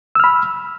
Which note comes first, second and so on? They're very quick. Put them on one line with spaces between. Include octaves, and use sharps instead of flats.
E6 F6 B5